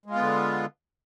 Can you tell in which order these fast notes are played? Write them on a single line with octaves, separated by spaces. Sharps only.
G#3 F4 B3 D3